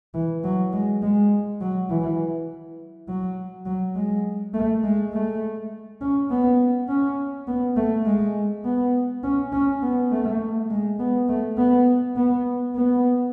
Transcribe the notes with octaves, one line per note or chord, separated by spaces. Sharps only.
E3
F#3
G#3
G#3
F#3
E3
F#3
F#3
G#3
A3
G#3
A3
C#4
B3
C#4
B3
A3
G#3
B3
C#4
C#4
B3
A3
G#3
B3
A3
B3
B3
B3